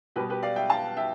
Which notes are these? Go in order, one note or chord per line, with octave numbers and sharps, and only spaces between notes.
B2 G3 B3 G4 B4
G4 B4
D5 F5
E5 G5
F5 A5
E5 G5